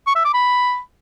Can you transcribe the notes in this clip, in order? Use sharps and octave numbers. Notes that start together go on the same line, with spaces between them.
C#6
E5
D6
B5